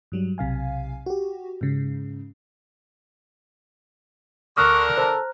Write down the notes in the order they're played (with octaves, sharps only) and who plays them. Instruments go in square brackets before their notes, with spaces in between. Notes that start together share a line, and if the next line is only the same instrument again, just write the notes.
[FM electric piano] G2 F#3 G3
B1 C3 F5 G#5
F#4 G4
G#2 C#3
[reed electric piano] D2 D#6 [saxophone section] D3 D4 A#4 [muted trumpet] C#6 [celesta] F6 F#6
[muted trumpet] A4 [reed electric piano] C5 A#5